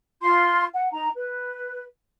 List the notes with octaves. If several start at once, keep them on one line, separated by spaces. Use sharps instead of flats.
F4 C6
F#5
D#4 A#5
B4